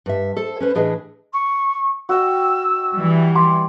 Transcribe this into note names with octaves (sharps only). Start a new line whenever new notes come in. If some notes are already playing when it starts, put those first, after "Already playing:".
G2 E5
A4 C5
C#4 B4 C5
A2 E3 D4 G#4 D#5 E5
C#6
F#4 D#5 G5 E6
E3 G3
G4 C6 D6